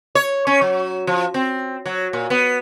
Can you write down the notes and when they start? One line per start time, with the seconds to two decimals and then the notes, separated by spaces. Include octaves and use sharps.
0.15 C#5
0.47 C#4
0.61 F#3
1.07 F3
1.34 C4
1.86 F#3
2.13 A#2
2.30 B3